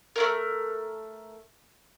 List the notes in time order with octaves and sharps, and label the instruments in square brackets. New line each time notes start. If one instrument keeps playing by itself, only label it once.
[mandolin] A3 C#4 A#4